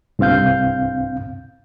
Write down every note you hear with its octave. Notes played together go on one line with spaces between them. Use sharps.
C2 G2 C4 F5 G6